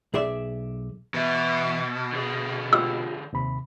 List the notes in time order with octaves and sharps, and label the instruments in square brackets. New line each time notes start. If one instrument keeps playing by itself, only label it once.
[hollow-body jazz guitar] B1 G#4 D5 E5
[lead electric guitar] B2 [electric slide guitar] E3 E5
[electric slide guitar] D3 G#4
[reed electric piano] F4 G4 [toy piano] E6
[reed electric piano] D#2 C3 B5